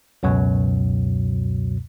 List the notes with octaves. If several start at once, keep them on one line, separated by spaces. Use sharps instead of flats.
C#2 F#2 B2 F#3